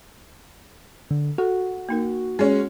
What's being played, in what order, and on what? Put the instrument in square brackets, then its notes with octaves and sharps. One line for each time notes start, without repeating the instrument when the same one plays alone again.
[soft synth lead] D3
[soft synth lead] F#4 [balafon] A4
[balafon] A#3 D#4 A#4
[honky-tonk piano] G#3 C#4